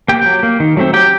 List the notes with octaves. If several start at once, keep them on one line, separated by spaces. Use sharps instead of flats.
A#3 G4 G5
F#3
A#3
D#3
F#3 A3 C4
F#3 G4 G5